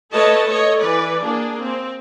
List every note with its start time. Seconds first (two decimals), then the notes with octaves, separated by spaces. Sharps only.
0.12 A3 A4 B4 C#5 D#5 A5
0.46 A4 C#5 D#5
0.79 E3 B4 D5
1.22 A#3 D4 G#4
1.61 C4